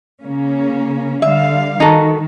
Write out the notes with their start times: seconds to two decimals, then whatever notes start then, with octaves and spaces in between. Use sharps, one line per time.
0.23 C#3 A#3 C#4
1.22 D3 G3 E5 F5
1.80 D#3 D#4 F#4 A4